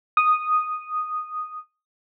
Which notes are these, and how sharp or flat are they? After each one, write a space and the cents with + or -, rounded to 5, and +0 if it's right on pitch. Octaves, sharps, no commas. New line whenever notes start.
D#6 -5